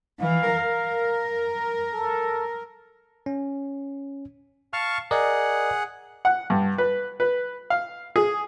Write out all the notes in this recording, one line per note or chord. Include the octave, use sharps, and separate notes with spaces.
E3 F5
A#4
A4
C#4
F5 A5 C#6 F6
G#4 A#4 D5 D#5 F#5
F#5
G2
B4
B4
F5
G#4